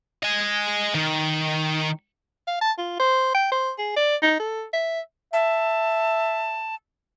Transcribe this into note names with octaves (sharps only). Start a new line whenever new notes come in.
D#5 G#5
D#3
F5
A5
F4
C5
G5
C5
G#4
D5
D#4
A4
E5
E5 A5